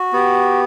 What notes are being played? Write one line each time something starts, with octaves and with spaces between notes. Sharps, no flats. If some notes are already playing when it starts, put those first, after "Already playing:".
Already playing: F#4
B3 G4